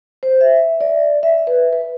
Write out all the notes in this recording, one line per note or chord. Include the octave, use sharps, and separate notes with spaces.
C5
E5
D5
E5
B4
B4